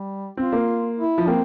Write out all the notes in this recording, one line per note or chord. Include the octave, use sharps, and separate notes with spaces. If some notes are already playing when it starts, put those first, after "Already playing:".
Already playing: G3
C4 F4
A#3
E4
F3
A#3 C4